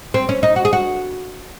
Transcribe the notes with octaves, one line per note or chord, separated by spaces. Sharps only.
C4
C#4
D#4
F#4
G#4
F#4